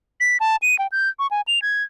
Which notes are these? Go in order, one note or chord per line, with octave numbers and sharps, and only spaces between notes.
B6
A5
D#7
G5
G6
C#6
G#5
F7
G#6